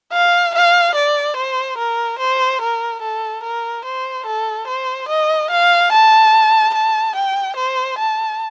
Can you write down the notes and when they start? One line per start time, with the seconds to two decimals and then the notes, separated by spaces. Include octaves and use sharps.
0.13 F5
0.54 F5
0.95 D5
1.36 C5
1.77 A#4
2.19 C5
2.61 A#4
3.02 A4
3.43 A#4
3.85 C5
4.26 A4
4.67 C5
5.08 D#5
5.50 F5
5.92 A5
6.74 A5
7.15 G5
7.56 C5
7.98 A5